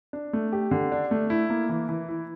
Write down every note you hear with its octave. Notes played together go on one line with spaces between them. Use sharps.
D4
A3
G4
D3
D4
A3
E4
A#3
E3
E3
E4